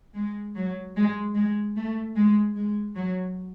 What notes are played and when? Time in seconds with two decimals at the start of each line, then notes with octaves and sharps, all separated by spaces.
0.15 G#3
0.56 F#3
0.96 G#3
1.35 G#3
1.76 A3
2.16 G#3
2.56 G#3
2.96 F#3